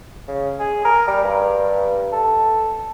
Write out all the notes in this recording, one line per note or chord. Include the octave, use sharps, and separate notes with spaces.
C#3
G#4
A#4
G3
G2
A4